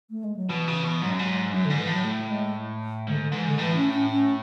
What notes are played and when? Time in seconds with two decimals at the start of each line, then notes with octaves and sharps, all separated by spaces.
0.10 A3
0.24 G#3
0.37 F#3
0.50 B2 E3
0.68 C#3
0.84 B2
1.01 G#2 F#3
1.10 F#2
1.19 G#2
1.53 F#2 F#3
1.65 G#2 D3
1.78 E3
1.87 A2 F#3
2.04 A3
2.30 G#3
3.07 G#2 D3
3.20 D3
3.32 G#2 E3
3.46 D3
3.59 A2 E3
3.76 C#4
3.93 C#4
4.10 C#4